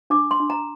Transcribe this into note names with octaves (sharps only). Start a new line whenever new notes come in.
D4 D6
C6
D4
A#5